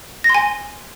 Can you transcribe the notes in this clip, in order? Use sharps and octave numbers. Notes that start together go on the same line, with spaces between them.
A#6
C6
G#5